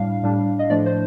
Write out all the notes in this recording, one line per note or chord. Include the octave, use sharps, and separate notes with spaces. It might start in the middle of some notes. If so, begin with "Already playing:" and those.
Already playing: A2 G3 D4 F5
A2 G3 D4
D#5
A2 F3 A3 D4 D5
C5